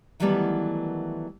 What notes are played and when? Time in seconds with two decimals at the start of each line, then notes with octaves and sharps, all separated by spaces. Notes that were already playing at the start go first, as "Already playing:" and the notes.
0.20 D#3 E3 F#3 G3 A3 B3